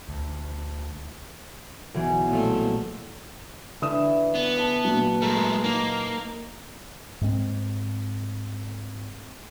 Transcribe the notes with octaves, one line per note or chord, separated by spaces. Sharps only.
D2
B1 E3 G#4
A#2 F3 A3
D3 E3 D#6 E7
B3
A5
A#2 F#3
G#3 A3 A#4
A#3 D#4
G#2 G#3 C4